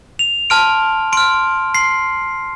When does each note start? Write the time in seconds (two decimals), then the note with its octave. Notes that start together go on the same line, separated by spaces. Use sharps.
0.19 F7
0.50 A5 C6 F6 D7
1.12 C6 F6 D7
1.75 C6 C7